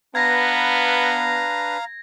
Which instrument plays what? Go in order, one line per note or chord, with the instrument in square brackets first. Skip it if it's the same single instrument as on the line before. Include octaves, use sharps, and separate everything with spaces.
[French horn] B3 [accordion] D4 B4 [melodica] F5 A#5 [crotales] G#6 A#6